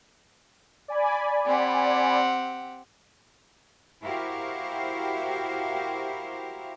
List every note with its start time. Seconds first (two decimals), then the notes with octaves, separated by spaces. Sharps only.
0.88 D5 G#5 B5
1.45 C4 G4 F#5
4.03 E4 F#4 G4 A#4 C5 F5